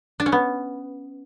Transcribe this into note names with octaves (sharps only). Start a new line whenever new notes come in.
D4
C#4
B3